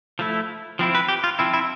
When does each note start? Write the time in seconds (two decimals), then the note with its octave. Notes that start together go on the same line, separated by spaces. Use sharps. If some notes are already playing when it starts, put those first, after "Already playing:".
0.19 F3 A3 E4
0.79 F3 C4 E4
0.95 B4
1.09 G4
1.24 F4
1.39 F3 C4 E4
1.54 E4